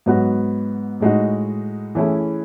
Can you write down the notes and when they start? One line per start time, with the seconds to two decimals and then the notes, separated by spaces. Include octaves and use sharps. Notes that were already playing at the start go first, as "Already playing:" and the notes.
0.06 G#2 F#3 B3 F#4
1.00 A2 G#3 D#4 F#4
1.95 E3 A3 C#4 E4 G#4